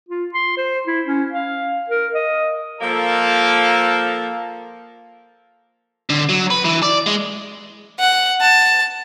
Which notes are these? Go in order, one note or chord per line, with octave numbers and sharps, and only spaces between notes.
F4
C6
C5
E4
C#4
F5
A#4
D#5
F3 A#3 A4
D3
F#3
B4
E3
D5
G#3
F#5
A5